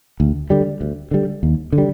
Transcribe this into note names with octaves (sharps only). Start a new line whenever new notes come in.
D2
D3 G3
D2
D3 G3
D#2
D3
G3